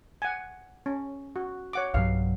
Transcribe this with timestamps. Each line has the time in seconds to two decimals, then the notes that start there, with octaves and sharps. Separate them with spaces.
0.22 F#5 G#5
0.86 C#4
1.36 F#4
1.73 C#5 F#5 D6
1.94 B1 G2 F#3 F5